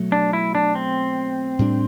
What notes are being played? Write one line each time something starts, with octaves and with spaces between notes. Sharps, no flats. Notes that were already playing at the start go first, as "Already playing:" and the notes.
Already playing: B2 F#3 A3
D4
E4
D4
C4
A2 G3 D4